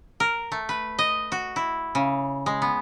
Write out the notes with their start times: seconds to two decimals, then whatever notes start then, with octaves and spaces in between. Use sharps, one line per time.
0.20 A#4
0.52 A3
0.69 B4
0.99 D#5
1.32 F#4
1.56 E4
1.95 C#3
2.46 G#3
2.62 B3